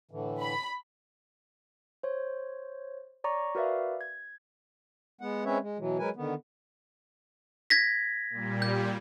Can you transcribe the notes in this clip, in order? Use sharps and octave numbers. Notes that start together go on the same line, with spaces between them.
A2 D3 E3
B5
C5 C#5
C#5 D5 A#5 C#6
F#4 A#4 B4 D5 E5 F5
G#6
G#3 B3 F#5
G#3 C4 C#4 B4 C#5 E5
G#3
B2 E3 F#3
F#3 G#3 A#4 B4 G#5
D3 D#3 B3
G#6 A#6 B6
A#2 G3
G6